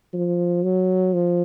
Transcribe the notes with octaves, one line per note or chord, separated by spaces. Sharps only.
F3
F#3
F3